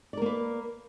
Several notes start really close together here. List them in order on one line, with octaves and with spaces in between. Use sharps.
D5 A#4 A#3 B4